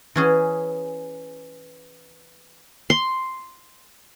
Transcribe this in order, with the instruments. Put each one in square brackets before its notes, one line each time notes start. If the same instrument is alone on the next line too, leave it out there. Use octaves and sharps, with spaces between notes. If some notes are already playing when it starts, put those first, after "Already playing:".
[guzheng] E3 C#4 G#4
[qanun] C6